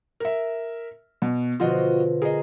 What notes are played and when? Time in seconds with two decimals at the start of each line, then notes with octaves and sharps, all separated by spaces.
0.20 A#4 E5
1.22 B2
1.60 B2 D3 F3 F4 F#4 D#5
2.22 G#4 A#4 D#5